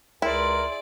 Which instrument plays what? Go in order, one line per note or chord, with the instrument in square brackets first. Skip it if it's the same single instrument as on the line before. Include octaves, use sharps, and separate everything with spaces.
[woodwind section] C#2 A#4 [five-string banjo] E4 [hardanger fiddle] G#4 D5 [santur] E5 C6